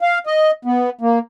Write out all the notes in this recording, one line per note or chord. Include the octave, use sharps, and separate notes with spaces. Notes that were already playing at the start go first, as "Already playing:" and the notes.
F5
D#5
B3
A#3